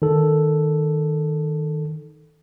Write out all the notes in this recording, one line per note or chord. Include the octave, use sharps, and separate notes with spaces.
D#3 A4